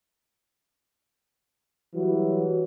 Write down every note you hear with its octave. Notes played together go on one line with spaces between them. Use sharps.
E3 F#3 G3 F#4